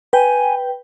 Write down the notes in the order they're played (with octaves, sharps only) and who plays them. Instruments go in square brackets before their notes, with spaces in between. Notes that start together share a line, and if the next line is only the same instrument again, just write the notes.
[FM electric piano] B4 G5 [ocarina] G#5